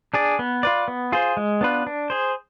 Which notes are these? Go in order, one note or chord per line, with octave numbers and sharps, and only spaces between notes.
D4 G#4 D5
B3
F4 B4 D5
B3
F4 G#4 C5
G#3
B3 D4 F4 B4
D4
G#4 C5